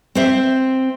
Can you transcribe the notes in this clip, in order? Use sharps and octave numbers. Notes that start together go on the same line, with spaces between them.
C4 C5 E5